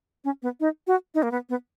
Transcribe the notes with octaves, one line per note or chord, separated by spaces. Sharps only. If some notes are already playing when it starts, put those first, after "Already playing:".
C#4
B3
D#4
F#4
D#4
A#3
B3
B3